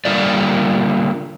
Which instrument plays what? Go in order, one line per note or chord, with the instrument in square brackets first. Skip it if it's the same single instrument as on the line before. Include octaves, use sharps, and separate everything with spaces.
[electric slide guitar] D3 G3 A#3 F4 D5